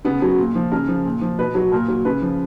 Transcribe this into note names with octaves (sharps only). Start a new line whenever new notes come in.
C#3 B3
F#3
A#2
F3
C#3 A#4
F3
A#2
F3
B2 B4
F#3
A#2 A#4
F#3
C#3 B4
F3